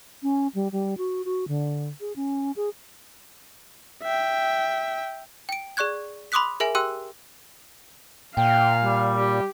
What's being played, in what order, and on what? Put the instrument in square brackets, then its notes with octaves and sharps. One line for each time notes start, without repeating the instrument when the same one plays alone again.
[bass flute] C#4
G3
G3
F#4
F#4
D3
G#4
C#4
G#4
[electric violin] E5 G5
[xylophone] G5 D7
G#4 D5 C#6 F#6 G#6
B5 C6 D6 D#6 F#6 B6
G#4 A#4 E5 G#5
G4 G5 C6 E6 F#6
[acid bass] A#2 [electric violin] F5 [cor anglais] G5
[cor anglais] G3
[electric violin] G4